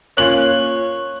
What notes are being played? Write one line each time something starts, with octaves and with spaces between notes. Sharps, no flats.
A#3 C#4 F4 C#5 F#6 F#7